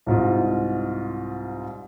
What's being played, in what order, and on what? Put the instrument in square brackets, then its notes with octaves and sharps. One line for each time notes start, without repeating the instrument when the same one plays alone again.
[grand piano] C2 G#2 F4